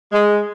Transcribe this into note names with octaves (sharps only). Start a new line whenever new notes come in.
G#3